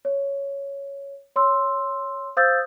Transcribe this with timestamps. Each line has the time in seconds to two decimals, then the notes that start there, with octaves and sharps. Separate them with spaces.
0.05 C#5
1.36 C#5 C6 E6
2.37 C5 F5 D#6 E6 G6 A6